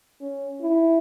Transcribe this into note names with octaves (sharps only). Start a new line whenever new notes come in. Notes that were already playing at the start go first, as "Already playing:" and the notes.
C#4
E4